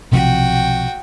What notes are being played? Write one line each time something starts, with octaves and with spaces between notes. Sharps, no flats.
B1 C3 F3 F#4 G5